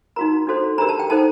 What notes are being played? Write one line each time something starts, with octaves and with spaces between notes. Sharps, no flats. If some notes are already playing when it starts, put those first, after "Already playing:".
D#4 F#4 A#4 A#5
D4 F#4 A4 C5
D4 G4 A#4 A#5
A5
G5
D#4 A4 C5 A5